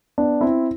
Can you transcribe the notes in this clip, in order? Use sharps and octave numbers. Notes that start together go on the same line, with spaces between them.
B3 D4
C4 E4